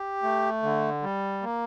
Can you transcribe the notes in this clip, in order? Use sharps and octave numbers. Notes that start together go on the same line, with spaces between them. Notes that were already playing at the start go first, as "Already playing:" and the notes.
Already playing: G4
A3
D3
G3
A#3